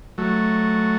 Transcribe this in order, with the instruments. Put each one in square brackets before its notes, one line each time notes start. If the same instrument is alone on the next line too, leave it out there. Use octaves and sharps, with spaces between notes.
[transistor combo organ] F#3 A3